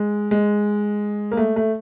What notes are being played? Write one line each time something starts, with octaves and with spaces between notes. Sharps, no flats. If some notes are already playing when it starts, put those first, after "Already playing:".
Already playing: G#3
G#3
A#3
A3
A3